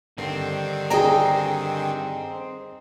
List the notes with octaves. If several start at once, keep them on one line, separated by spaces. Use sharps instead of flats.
G2 D3 D#3 C4
G#4 D#5 G5 G#5 A#5